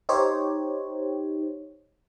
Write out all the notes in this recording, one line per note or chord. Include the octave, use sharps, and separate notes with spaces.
D#4 G4 C5 C#5